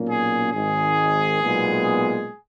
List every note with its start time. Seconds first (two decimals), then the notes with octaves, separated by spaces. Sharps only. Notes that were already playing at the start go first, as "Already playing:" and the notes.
Already playing: B1 A#2 A#3 C#4
0.08 G#4
0.52 G#1 G#2 D#3 G#4
1.40 B1 A#2 G#3 B3